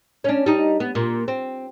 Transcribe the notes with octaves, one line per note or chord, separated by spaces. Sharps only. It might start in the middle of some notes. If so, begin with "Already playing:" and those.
C#4 D4
G3 D#4
B3
A#2
C4